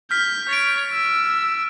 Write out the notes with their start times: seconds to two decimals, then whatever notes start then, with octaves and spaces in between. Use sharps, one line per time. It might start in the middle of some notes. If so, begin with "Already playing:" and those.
0.11 F6 G6 B6
0.49 C#5 A6 B6 D7
0.93 E6